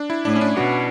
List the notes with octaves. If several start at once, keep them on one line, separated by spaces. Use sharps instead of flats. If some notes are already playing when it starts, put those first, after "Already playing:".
Already playing: D4
E4
A2 D4
C#4
D4
B2 F#4